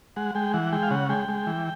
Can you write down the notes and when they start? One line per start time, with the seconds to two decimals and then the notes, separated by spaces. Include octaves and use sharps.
0.16 G#3 F#5
0.35 G#3 G5
0.54 E3 F#5
0.72 G#3 G5
0.83 F5
0.91 C#3 F#5
1.09 G#3 G5
1.29 G#3
1.47 E3